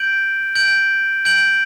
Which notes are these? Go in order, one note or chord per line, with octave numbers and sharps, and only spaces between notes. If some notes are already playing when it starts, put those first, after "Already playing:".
Already playing: G6 D7 F#7
G6 D7 F#7
G6 D7 F#7